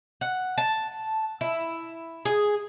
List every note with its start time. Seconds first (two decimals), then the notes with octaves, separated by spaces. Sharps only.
0.21 F#5
0.58 A5
1.41 E4
2.25 G#4